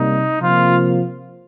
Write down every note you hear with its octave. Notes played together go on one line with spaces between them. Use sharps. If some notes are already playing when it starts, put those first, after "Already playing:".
Already playing: C3 G3 A#3 D#4
C3 F3 A#3 F4